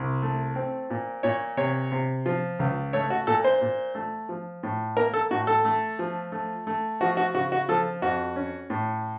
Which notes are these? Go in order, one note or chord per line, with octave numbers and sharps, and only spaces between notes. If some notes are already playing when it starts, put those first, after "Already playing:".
Already playing: C2
A3
C4
A#2
A#2 C#5
C3 C#5
C3
F3
C#2
A3 C#5
F#4
A#2 A4
C5
A#2
A3
F3
A2
A#3 A#4
A4
A2 F#4
A4
A3
F3
A3
A3
F3 F#4
F#4
C#3 F#4
F#4
F3 A4
F2 F#4
C#4
A2